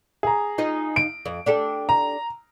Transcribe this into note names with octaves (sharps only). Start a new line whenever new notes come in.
G#4 A#5
D#4 F4 D#5
D7
F2
D4 G4 A4
A#5